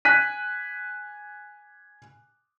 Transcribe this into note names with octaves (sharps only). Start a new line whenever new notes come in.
G#5 F#6 B6 D#7